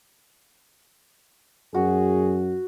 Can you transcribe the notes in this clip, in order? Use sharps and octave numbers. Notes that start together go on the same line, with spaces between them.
F#2 F#4 G#4